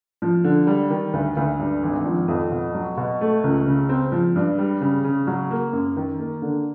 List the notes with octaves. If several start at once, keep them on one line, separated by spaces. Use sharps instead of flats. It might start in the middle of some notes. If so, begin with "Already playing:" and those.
F3
D3
G3
D#3
D2
D2
G2
G#1
F3
F2
B2
F#3
B2
A3
C#2
C#3
C4
F3
G2
G3
C#3
C#3
F#3
A#3
F#2
D#3
A#3
D3